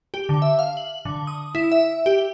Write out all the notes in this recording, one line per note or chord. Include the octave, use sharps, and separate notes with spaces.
G4
D3
E5
F5
F#7
D3
D#6
E4
E5
G4